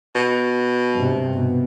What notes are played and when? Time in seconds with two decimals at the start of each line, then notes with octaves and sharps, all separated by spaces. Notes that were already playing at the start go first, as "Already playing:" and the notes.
0.15 B2
0.92 G2 C3
1.34 B2